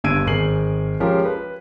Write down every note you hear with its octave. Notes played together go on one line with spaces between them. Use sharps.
G1 G2 E6 G#6 D7 D#7
G#1 G#4 A#4 C7 F#7
F3 G#3 C#4 G4 A#4
B4